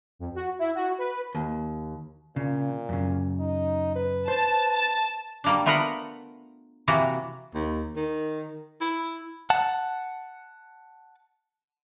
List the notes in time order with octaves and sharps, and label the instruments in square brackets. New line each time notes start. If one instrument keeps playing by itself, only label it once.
[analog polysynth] F2
F#4
E4
F#4
B4
[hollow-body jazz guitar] D#2
[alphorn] A#2 [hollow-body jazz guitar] C#3
[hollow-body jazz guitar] F#2 C#3
[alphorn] D#4
B4
[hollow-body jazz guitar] C5 [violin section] A5
[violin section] A5
[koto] G3 A#3 D4
A3 B3 F4 A#4 B4 F#5
C3 E3 A#3 F#4
[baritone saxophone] D#2
D#3
E4
[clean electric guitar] F#5 A5